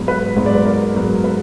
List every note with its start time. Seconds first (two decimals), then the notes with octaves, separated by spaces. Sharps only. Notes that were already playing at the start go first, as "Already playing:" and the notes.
Already playing: G#2 F#3 B3
0.08 B4
0.36 G#2 F#3 B3 B4
0.46 D5
0.55 B4
0.66 A#4 D5
0.94 G#2 F#3 B3 A#4
1.24 B4